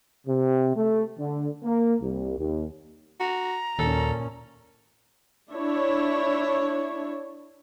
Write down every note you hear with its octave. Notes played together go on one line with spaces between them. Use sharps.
C3
A3
D3
A#3
C2
D#2
F#4 A#5
D#2 A#2 C#4 A4
D4 E4 C#5